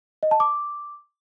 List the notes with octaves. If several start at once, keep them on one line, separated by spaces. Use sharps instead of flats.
D#5
A5
D6